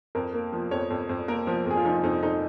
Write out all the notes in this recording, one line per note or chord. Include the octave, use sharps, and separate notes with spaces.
F2 A#4
A#3
F3
F2 C#5
F2
F2
A#3 A#4
F3
F2 G#4
F4
F3 D#4
F2 D#4
F2 D#4